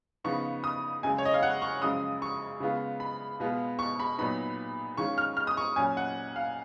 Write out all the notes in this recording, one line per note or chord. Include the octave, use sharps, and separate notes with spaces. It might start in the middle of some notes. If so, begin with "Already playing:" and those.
C#3 F3 B3 D#4 C#6
D#6
F#2 C#3 G#3 G#5
C#5
D#5
F5
F#5
C#6
F#2 C#3 F3 G#3 C#4 D#6
C#6
C#3 G#3 B3 F4
B5
B2 G#3 B3 F4
C#6
B5
A#2 F#3 B3 D#4 B5
D#3 G#3 C#4 F4 C#6
F6
F6
D#6
C#6
A#2 F#3 C#4 G#5
F#5
F5